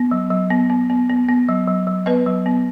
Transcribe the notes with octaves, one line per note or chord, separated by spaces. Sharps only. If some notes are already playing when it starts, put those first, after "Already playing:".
Already playing: B3
F#3
F#3
B3
B3
B3
B3
B3
F#3
F#3
F#3
B3 B4 D#5
F#3
B3